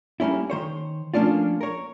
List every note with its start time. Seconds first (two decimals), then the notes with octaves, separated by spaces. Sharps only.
0.20 G3 A#3 C#4 E4
0.50 D#3 C5 C#5
1.14 F3 A3 A#3 C#4 D4 F4
1.61 A#4 C#5